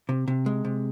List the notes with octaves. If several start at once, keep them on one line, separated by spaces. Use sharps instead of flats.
C3
C3
G#3
C3